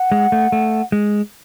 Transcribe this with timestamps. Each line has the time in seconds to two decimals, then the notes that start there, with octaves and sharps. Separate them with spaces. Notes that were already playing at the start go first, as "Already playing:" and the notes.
Already playing: F#5
0.12 G#3
0.32 A3
0.52 A3
0.92 G#3